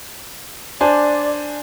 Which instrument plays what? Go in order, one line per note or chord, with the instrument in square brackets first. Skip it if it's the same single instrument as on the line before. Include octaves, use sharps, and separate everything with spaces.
[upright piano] D4 C5 G#5 [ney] D5